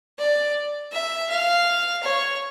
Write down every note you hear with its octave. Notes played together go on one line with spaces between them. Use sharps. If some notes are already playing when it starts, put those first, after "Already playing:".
D5
E5
F5
C#5